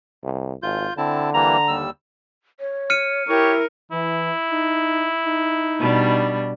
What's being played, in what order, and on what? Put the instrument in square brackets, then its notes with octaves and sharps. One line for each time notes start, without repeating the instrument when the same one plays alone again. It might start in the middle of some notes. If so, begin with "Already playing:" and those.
[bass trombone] C2
[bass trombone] G#1 [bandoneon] F4 G6
[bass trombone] D3 [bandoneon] C4 E4 A5
[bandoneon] E3 G3 A#3 [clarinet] A#5
[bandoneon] D#2 G3 E6
[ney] C#5
[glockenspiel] F6 C#7 D#7
[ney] E4 [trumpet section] G4 C#5 [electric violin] A#4
[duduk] E3 [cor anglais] E4
[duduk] D#4
D#4
[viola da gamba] B2 G3 D4